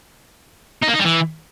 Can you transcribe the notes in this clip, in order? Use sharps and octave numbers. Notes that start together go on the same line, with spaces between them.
D#4
A#3
D#4
G3
E3